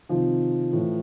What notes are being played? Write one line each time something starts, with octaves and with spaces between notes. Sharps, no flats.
C3 D#3 F3
A2 E3